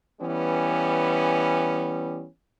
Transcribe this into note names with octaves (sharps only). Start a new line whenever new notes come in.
E3 G3 B3 C#4